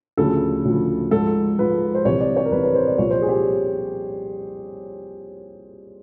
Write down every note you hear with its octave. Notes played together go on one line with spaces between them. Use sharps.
D2 C#3 F3 A4
D2 C#3 F3
G#2 F3 A4
G#2 F3 B4
C5
C2 C3 E3 C#5
D5
C#5
A#4
C2 C3 E3 B4
B4
C5
D5
C2 A#2 F3 C#5
C5
G#4
G4